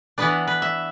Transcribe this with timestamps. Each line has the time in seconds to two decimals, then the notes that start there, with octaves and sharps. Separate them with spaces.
0.18 E3 B3 D4 B4
0.47 B4
0.62 E5